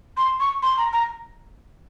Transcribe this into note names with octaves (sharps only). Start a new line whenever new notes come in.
C6
C#6
C6
A#5
A#5